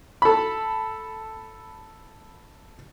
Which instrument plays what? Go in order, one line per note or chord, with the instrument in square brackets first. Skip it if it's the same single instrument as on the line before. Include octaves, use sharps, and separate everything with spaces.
[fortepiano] A4 B5